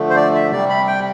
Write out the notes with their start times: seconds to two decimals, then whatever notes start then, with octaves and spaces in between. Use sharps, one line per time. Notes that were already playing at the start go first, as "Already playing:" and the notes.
Already playing: D3 F3 A3
0.10 C5
0.16 D5
0.35 E5
0.51 C3 G3 D5
0.69 B5
0.87 G5